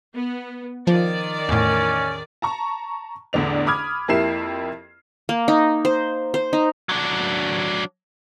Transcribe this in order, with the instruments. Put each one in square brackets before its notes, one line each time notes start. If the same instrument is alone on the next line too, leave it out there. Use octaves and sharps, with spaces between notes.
[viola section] B3
[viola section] D#3 D5 [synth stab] F3
[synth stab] E2 A2 [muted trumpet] C#4
[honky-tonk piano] A5 A#5 C#6
A1 E2 D3 D4 F7
B5 D6 D#6 F6 G#6
F2 A#3 E4 G4 C7 E7
[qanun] A#3
D#4
C5
C5
D#4
[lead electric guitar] F#3 D4